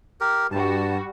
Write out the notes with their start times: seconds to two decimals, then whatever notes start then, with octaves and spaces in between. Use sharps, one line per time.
0.21 G4 A#4
0.52 G2 G3 F#4 A5